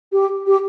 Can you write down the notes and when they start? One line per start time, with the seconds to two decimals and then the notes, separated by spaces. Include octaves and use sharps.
0.12 G4
0.47 G4